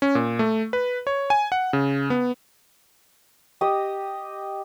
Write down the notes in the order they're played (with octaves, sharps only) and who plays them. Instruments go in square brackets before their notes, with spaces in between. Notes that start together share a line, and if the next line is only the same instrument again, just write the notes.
[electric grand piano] C#4
A#2
A3
B4
C#5
G#5
F#5
C#3
B3
[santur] G4 D#5